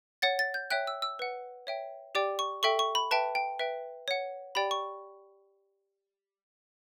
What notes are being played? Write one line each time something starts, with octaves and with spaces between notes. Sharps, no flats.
C#5 F#5 A6
A6
G6
C#5 E5 G5 F#6
E6
E6
B4 F#5
C#5 E5 G5
G4 D5 G5 D6
C#6
A4 E5 G5 C#6
C#6
B5
B4 E5 G5 A5
G5
B4 E5 G5
C#5 F#5
G4 D5 G5 B5
C#6